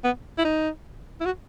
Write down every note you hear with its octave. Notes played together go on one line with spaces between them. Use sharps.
B3
E4
D#4
E4
F#4